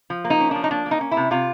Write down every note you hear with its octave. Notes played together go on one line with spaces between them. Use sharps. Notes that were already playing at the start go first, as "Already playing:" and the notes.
F3
A#3
D#4
C#4
F3 D4
D#4
A#3 D4
A#3
D#4
C#4
E4
C3
C3 F4